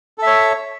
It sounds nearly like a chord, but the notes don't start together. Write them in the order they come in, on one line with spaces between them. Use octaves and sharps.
A4 E5 C#5